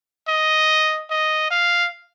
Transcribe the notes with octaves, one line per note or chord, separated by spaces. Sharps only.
D#5
D#5
F5